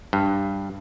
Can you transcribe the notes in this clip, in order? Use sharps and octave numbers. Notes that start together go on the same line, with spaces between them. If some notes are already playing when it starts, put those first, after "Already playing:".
G2